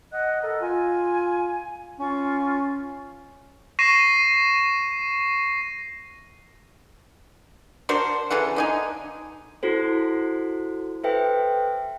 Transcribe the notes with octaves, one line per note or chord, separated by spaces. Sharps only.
D#5 F#5 F#6
A4 A#4 D#5
F4 G#5
C#4 F4 C#6
C#6 A#6 C7 D#7 E7
D4 F#4 A#4 C5
C#3 E3 A4 F#5
D3 D#4 G#5
E4 F#4 A4 C5
A4 B4 C5 E5 G5